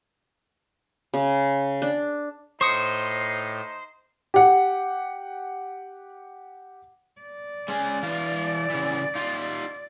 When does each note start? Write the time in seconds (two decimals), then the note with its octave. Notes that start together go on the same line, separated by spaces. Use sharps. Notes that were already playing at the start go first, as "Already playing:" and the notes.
1.14 C#3
1.82 D4
2.61 A2 D#4 C5 C#6 D#6 C#7
4.34 G4 F#5
7.21 D5
7.68 G#3 C#4 G#4
8.03 E3 F5
8.70 C#3 E3
9.15 D#4 F4